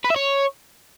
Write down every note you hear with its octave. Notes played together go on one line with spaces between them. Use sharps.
B4
E5
C#5